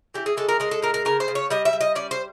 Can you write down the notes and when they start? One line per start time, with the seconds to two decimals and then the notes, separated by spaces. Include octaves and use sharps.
0.14 E3 G4
0.26 G#4
0.37 G#3 A4
0.49 A#4
0.60 G#3 A#4
0.71 A4
0.82 A2 A#4
0.94 A#4
1.05 C#3 A#4
1.20 C5
1.28 C#3
1.35 C#5
1.50 G3 D#5
1.65 E5
1.73 G3
1.81 D#5
1.95 C#4 D5
2.11 C5